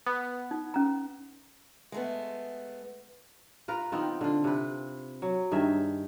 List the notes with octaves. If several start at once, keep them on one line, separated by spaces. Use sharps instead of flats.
B3
D#4
C#4 A#5
G#3 A3 B3
F4 A#4 B4 F5
D#3 B3 C4 F4
D3 F4
C3 B4
F#3
G2 D#3 G#4 E5